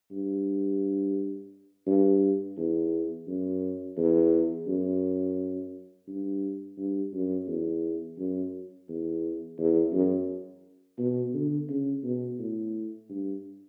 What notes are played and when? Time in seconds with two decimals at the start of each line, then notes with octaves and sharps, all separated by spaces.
0.12 G2
1.87 G2
2.57 E2
3.28 F#2
3.97 E2
4.67 F#2
6.08 G2
6.78 G2
7.13 F#2
7.48 E2
8.18 F#2
8.89 E2
9.59 E2
9.93 F#2
10.99 B2
11.34 D3
11.69 C#3
12.04 B2
12.39 A2
13.09 G2